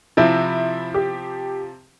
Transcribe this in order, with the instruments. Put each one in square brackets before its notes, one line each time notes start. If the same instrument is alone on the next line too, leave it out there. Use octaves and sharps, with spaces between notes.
[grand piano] C3 F3 C4 [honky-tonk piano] E4
[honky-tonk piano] G4